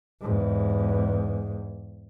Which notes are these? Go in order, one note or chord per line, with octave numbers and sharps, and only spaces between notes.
E2 G#2